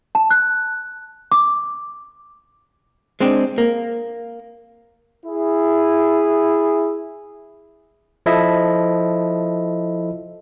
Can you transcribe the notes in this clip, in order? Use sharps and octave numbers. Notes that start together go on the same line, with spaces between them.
A5
F#6
D6
G#3 C4 D4
A#3
E4 G#4
F3 E4 A4 D#5 E5